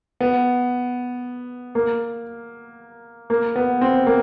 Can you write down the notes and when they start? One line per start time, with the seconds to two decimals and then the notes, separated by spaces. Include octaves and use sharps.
0.21 B3
1.75 A#3
3.30 A#3
3.56 B3
3.82 C4
4.07 A#3